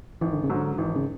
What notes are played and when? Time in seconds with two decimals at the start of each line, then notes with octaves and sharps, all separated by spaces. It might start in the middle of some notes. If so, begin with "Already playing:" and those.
0.21 G#1 E3
0.33 D3
0.44 C#3
0.50 G#2 D3 F#3
0.78 G#1 E3
0.96 C#3